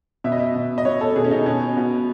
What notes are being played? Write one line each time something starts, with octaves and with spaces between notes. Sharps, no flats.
B2 E5
D#5
E5
B2
D#5
B2 C#5
A4
B2 G#4
C#4
D#4
B2 C#4
B2